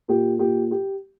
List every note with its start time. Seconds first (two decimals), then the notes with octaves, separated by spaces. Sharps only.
0.08 A#2 G4
0.39 A#2 G4
0.71 G4